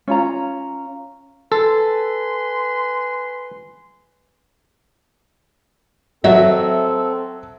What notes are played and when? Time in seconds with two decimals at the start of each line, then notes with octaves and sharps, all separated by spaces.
0.08 C#4 F4 A#5
1.52 A4 B4 G#5 C6
6.24 F#3 C4 F#4 A4 E5